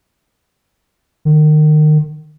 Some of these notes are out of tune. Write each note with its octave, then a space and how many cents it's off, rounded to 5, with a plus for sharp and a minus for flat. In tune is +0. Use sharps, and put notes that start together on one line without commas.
D#3 -30